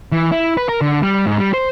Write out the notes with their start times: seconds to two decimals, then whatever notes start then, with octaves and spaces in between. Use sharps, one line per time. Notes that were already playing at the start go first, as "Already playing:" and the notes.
0.12 E3
0.32 E4
0.57 B4
0.69 A#4
0.81 D3
1.02 G3
1.26 G#2
1.38 G3
1.54 C5